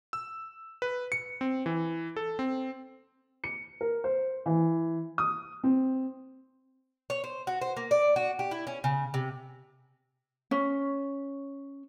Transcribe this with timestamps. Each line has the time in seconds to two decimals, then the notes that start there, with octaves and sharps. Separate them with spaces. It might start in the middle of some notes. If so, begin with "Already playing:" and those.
0.13 E6
0.82 B4
1.12 C#7
1.41 C4
1.66 E3
2.16 A4
2.39 C4
3.44 C#7
3.81 A#4
4.04 C5
4.46 E3
5.18 D#6
5.64 C4
7.10 C#5
7.24 C5
7.47 F#4
7.61 C5
7.77 A#3
7.91 D5
8.16 F#4
8.39 G4
8.51 E4
8.67 C#4
8.84 C#3
9.14 C3
10.51 C#4